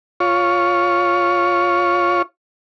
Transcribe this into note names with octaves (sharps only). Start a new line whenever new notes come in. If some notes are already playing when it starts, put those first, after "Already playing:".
F4 C#5